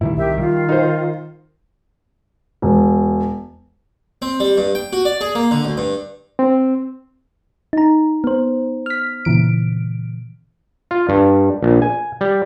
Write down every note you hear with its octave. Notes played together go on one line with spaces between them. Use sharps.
A2 D#3 G3 E4
C2 D#3 G4 E5
G3 F4
D#4 C5
E1
C4
G3
G2
G5
F#4
D5
G#4
A#3
D3
D2
G2
C4
D#4 A#5
B3 C5
F6 B6
A#2 C#3 E3 D7
F4
G2
A#1
G#5
G3